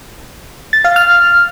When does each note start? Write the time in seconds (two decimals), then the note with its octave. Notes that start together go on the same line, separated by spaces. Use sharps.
0.73 A6
0.85 F5
0.96 F6